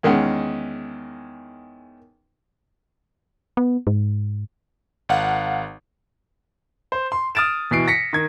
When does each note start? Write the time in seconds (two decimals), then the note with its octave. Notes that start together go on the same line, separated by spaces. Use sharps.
0.03 E2 D#3 G#3 C#4 F#5
3.57 B3
3.87 G#2
5.09 G#1 F5 F#5
6.92 C5
7.12 C6
7.35 D#6 F6 A6 D7 E7
7.71 B2 E3 C7 D7
7.88 A#6 B6 C#7
8.13 D#3 G#6